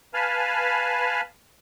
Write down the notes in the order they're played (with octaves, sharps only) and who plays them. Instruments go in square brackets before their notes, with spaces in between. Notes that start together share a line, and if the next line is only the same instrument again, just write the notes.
[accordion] B4 F5 G#5 A5 B5 F6